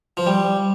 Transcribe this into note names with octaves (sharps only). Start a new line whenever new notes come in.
F3
G3